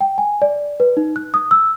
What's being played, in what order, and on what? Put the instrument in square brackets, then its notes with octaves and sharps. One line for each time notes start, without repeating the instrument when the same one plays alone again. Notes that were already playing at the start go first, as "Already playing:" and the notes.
[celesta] G5
G#5
D5
B4
D#4
F#6
D#6
E6